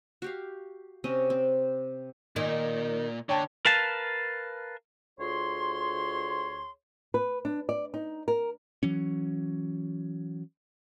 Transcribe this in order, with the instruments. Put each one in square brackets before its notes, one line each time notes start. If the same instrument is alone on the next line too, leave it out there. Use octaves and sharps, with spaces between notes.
[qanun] F#4 G4 F5
C3 C4 C#4 D#5
C4
[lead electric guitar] A#2 [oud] D#3
[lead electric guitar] D3 [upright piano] C#5 G5 A5
[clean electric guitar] A#4 B4 F5 A5
[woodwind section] D2 F4 G#4 C#5 C6
[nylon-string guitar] B4
D4
D5
D#4
A#4
[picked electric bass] E3 F#3 C#4